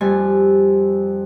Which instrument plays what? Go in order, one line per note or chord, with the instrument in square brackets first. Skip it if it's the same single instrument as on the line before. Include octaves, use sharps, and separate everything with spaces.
[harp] F2 G3 G#5